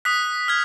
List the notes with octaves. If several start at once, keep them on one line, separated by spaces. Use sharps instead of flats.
D#6 F#6 B6
F6 G#6